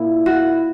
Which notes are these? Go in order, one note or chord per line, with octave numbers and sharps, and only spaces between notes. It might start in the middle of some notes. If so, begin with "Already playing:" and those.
Already playing: A#2 A#3 E4
F#4